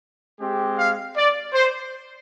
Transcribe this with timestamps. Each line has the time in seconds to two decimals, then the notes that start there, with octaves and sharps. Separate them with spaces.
0.40 G#3 C4 G4
0.78 F5
1.16 D5
1.54 C5